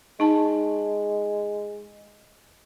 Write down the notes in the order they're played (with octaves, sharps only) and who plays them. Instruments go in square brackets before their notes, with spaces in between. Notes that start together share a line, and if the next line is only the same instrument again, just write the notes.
[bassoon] G#3 [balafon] D#4 A5